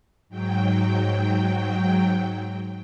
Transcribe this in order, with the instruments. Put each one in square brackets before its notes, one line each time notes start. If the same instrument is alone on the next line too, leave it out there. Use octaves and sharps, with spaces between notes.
[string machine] G#2 F#3 G5